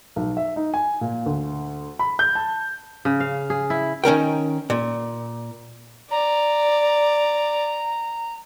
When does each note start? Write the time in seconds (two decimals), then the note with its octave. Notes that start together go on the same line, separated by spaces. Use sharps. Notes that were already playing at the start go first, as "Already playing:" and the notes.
0.16 B1
0.37 E5
0.56 D#4
0.74 G#5
1.01 A#2
1.26 D2
1.99 B5
2.19 G6
2.35 A5
3.05 C#3
3.20 F5
3.50 G#4
3.70 E4
4.04 D#3 C#4 A#4 G5
4.70 A#2
6.11 D5 A#5